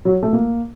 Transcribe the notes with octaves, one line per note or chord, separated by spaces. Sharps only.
F#3
A3
A#3